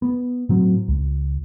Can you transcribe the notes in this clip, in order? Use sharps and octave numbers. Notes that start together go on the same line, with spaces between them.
B3
A2 F#3 C4
C#2